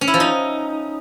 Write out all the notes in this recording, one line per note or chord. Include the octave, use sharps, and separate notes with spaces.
C#4
E4
F3
D#4